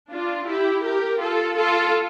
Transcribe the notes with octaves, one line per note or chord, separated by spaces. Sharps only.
D4 F4
E4 G4
G4 A#4
F4 A4
F4 A4